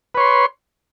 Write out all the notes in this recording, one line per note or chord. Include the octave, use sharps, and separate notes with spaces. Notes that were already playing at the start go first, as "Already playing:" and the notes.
B4 C#5 C6